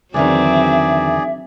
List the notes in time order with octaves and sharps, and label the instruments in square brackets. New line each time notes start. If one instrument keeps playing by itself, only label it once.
[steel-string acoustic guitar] E2 D3 D#3 [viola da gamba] F#3 C4 [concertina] G#4 D5 [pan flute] E5